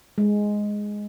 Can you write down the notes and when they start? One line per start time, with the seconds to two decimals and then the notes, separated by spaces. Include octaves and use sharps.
0.18 G#3